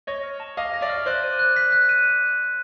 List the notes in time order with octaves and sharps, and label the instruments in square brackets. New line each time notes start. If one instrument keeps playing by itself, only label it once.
[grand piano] C#5 D#5 [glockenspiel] A#6
[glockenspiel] F6
A5
[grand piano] D#5 F5 [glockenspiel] D6
[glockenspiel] A#6
[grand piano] D5 E5
[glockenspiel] F6
[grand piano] C5 D5 [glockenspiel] F#6
[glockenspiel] D#7
F#6
B6
F#6
D#7